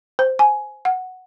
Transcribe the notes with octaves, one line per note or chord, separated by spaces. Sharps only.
C5
G#5
F#5